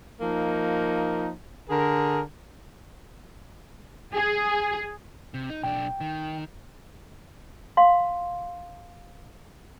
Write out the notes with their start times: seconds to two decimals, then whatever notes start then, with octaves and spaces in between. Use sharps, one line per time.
0.21 F3 A#3 D#4
1.69 D3 G#4 A#4
4.13 G#4
5.34 C3
5.50 D#4
5.63 B1 D4 G5
6.01 D#3
7.77 F5 C6